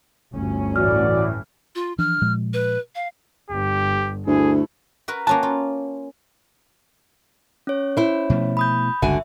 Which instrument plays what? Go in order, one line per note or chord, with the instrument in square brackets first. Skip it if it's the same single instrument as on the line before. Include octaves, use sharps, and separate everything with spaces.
[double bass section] G1 D2 C#4
[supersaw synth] A2 E3 [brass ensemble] F#4 D5 [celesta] F6
[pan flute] F4
[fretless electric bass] E3 F3 D4 [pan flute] F6
[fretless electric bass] A#2 F3 G#3
[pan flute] B4
F5
[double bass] G1 [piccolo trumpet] G4
[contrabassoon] D2 [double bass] A3 E4 [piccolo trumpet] G#4
[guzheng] F#4 A#4 B4
[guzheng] A#3 C#4 F#4 [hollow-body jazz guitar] A5
[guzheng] F4
[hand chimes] C#4 C#5
[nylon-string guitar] E4 C5
[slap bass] B2 F3 A3
[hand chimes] B5 D#6 G6
[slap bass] G1 C#2 [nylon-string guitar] D3 F#4 G#5 [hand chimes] E5